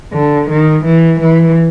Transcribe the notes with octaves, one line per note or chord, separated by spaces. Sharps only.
D3
D#3
E3
E3